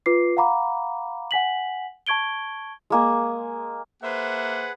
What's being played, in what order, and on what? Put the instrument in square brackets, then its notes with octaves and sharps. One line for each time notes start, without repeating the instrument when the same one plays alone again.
[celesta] F4 B4 D6 C7
F5 F#5 A#5 B5 D6
F#5 G#5 B6 F#7
A5 C#6 G#6 D7 G7
[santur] G#3 A#3 G#5
[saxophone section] A#3 C5 E5 [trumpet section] G#4 B4 F#5